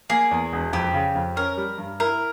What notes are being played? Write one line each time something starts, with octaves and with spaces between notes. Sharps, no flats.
A#3 G#4
E2
E1
F2 G4
C#3
F2
C#4 A#4
G3
G2
E4 A#4